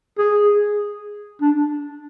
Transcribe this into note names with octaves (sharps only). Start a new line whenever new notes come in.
G#4
D4